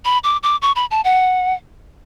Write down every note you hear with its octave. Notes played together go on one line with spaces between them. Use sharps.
B5
D6
D6
C#6
B5
A5
F#5